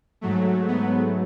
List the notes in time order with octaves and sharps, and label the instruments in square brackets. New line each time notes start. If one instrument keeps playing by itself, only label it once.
[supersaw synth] G#2 F#3 A3
B3